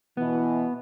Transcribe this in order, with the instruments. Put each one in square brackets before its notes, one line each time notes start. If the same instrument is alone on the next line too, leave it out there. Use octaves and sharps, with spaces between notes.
[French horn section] B2 E3 [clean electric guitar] B3